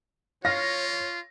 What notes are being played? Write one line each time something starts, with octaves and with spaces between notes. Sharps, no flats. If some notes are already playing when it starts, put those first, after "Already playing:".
F4 C#5 F5 A#6